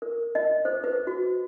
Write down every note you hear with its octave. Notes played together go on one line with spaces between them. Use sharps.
A#4
D#5
C5
B4
F#4